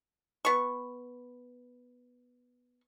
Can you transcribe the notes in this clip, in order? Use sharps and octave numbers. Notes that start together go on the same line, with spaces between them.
B3 C#6